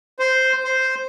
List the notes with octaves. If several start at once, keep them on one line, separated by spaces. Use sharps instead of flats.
C5
C5